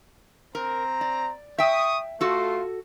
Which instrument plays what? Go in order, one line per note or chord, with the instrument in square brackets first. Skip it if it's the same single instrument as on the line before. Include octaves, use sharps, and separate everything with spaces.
[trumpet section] C4 A#5 [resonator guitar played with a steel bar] A#4
[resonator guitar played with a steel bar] D5
[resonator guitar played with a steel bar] E5 G5 [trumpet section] C#6 D#6
[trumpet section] A3 F4 C6 [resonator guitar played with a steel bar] F#4 A4